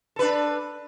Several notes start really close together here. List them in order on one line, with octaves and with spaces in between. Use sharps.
A4 B4 D4